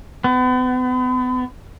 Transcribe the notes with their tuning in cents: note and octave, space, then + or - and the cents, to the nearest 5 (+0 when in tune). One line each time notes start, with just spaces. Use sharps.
B3 +40